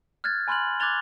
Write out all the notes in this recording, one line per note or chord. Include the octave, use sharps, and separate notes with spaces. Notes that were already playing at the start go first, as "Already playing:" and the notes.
F6 F#6 G#6 A6
G#5 B5 C6 F6 F#6 F#7
D6 F#6 G#6 A6 F7 G7